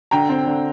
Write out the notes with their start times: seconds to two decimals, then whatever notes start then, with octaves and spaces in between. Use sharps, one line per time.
0.11 D3 G5 A#5
0.29 C4
0.47 D3